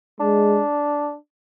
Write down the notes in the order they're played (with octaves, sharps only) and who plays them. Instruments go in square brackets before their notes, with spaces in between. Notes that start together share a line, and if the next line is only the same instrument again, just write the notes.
[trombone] G#3 [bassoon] D4